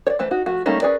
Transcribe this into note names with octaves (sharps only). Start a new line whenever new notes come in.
C#5 D5
E3 A3 B4 C5
D#4 F#4
F3 A3 F#4
G3 A3 A#3 C#4 D#4
C#4 G#4 A#4 B4 D5